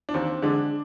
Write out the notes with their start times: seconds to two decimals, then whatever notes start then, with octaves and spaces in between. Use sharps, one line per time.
0.09 D4
0.14 D#2 C4
0.42 D3 G#3 D4